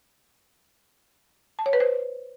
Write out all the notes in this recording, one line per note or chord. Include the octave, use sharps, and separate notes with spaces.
A5
C#5
B4
C5